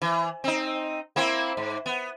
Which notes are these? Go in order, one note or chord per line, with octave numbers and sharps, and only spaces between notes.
E3
C4 D#4
A#3 C4 E4
G#2
B3